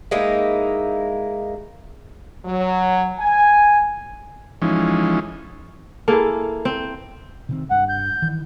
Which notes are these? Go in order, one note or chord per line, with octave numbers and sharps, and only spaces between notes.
G#3 A#3 D#4 E4
F#3
G#5
E3 F3 G#3 C#4 D#4
A#3 E4 G#4 A4
C4
C3 D#3 C4
G2 F#5
G6
D#3 E3